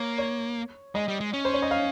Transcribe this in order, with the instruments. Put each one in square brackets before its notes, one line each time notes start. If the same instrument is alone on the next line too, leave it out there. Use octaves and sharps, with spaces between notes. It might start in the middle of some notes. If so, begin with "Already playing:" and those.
Already playing: [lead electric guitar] A#3 [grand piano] C#5
[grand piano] C#5
[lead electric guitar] G#3 [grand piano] D#5
[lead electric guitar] G3
G#3
C#4
[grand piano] C5
C#5
D#5
F5